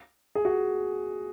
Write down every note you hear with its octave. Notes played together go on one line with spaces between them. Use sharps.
G#4
F#4